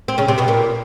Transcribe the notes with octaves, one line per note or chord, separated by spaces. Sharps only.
C4
C#3 C#4
C3 C4
B2 B3
A#2 A#3